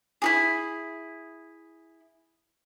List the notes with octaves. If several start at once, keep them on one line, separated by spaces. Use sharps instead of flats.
E4 F#4 G#4